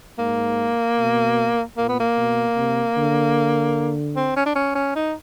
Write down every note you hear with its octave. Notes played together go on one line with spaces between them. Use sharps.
G#2 A#3
B2
A#2 A#3
B3
A#3
B2
C3
D3
C4
C#4
D4
C#4
C#4
D#4